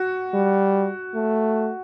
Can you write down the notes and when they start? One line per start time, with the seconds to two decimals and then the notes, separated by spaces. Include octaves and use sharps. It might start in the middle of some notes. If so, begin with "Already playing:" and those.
Already playing: F#4
0.33 G3
1.14 A3